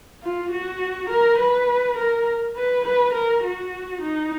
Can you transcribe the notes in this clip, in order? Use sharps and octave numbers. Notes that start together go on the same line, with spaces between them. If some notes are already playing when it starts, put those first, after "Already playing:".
F4
F#4
A#4
B4
A#4
B4
B4
A#4
F#4
D#4